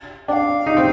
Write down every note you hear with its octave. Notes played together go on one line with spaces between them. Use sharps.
D4 F5 G5
D#4
C4